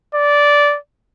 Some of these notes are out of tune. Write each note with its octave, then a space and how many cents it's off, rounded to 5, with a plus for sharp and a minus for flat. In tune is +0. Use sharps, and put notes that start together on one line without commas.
D5 -10